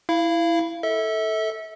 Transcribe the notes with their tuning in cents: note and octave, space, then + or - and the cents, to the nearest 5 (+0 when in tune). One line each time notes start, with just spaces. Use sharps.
E4 +0 F5 -25
A4 +0 E5 -35